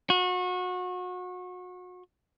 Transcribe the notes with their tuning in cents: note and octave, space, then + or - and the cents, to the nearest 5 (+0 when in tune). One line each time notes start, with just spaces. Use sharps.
F#4 -30